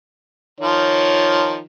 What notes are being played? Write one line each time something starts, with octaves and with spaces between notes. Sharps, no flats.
D#3 F3 C#5